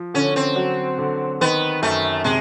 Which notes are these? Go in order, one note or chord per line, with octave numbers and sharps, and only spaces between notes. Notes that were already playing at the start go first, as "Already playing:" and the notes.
Already playing: F3
D3 C#4
C4
F#3
D3
D#3 B3
F#2 A3
C3 G#3